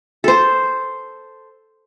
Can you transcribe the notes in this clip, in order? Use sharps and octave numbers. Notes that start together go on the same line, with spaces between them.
A4 C5